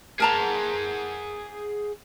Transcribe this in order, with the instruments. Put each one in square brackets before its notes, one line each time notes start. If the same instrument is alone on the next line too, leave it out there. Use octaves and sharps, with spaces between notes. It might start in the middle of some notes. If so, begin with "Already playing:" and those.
[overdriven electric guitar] G#4 F#5 [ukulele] A#4 A5 A#5